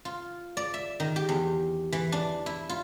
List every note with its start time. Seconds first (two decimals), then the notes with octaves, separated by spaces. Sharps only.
0.05 F4
0.57 D5
0.74 E5
1.00 D#3
1.16 G4
1.29 E2
1.93 E3
2.12 D4
2.46 E4
2.69 F4